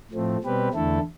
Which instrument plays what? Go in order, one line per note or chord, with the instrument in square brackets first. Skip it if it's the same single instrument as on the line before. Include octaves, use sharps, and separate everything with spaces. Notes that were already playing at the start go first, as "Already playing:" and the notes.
[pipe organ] A2 F3 A3 C4
B2 G3 C4 G4 B4
E2 D3 A3 E4 A4